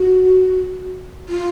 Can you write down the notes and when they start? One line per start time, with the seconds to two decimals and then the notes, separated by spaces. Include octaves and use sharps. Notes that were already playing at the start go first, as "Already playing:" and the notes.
Already playing: F#4
1.29 F4